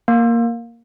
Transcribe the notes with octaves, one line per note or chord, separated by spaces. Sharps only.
A#3